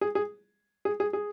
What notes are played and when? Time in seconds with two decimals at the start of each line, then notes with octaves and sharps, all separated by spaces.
0.01 G#4
0.15 G#4
0.85 G#4
1.00 G#4
1.13 G#4